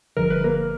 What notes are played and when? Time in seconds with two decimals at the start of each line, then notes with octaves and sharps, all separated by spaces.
0.17 G1 G2 D3 F3 A#4
0.30 B4
0.44 A#3 A#4